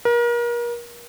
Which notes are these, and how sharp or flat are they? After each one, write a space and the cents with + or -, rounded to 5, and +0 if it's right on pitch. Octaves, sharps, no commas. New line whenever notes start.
A#4 +35